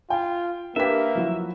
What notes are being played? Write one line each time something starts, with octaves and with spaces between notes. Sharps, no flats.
F4 G5
A#3 D4 G4 A#4 B4 E5 B6
F3 F#3 E4